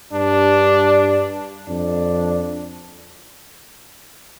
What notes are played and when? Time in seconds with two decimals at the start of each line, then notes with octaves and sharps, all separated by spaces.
0.13 G2 D4
1.68 F2 D4